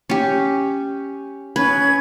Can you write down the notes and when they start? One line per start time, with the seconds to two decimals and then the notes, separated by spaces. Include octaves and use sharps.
0.10 C#4 G4
1.56 C#4 B4 G#6